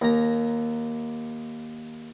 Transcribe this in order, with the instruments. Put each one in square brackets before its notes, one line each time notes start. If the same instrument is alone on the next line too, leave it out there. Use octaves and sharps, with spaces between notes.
[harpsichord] D#2 A#5